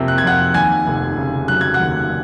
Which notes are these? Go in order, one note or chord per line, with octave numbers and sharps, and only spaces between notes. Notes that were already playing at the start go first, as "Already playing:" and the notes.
Already playing: F2 C3 F3 A#3
F#6
G#6
F2 F#5 F#6
D#2 G#5 G#6
F1
C#3
F#3 F#6
G#6
F#5 F#6
D#2